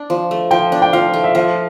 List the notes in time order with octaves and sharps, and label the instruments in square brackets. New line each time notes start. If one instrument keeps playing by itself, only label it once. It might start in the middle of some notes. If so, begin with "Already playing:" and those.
Already playing: [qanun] D4
F3
A3
[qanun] F3 [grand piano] G5
[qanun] D4
[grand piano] G5
[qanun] F3 [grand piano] F5
[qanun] A3
[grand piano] E5
[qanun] F3 [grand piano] F5